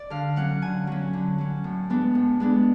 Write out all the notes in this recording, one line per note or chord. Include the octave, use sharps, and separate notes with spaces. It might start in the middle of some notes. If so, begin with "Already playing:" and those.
Already playing: D5
D3 F5
F#3 C#4 F#5
D3 G#5
F#3 C#4
D3
F#3 C#4
A2
G#3 B3 D4
A2
G#3 B3 D4